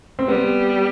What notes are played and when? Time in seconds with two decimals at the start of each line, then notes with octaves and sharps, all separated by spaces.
0.19 C4
0.28 G3 B3